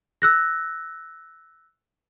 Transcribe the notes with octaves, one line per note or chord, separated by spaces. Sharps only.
E6 F#6 A#6